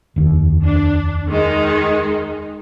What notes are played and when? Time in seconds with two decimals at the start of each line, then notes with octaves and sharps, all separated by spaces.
0.16 F1 D#2
0.63 D4
1.29 D#3 G#3 D#4